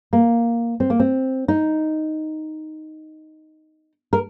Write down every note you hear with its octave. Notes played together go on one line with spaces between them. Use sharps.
A#3
C4
A#3
C4
D#4
A#4